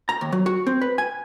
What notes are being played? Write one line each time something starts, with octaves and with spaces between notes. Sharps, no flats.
A#5
D#2
F#3
F#4
C4
B4
G#5